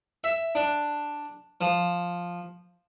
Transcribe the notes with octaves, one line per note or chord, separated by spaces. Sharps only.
E5
D4
F3